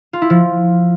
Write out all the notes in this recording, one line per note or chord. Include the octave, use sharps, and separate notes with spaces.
F4
E4
F3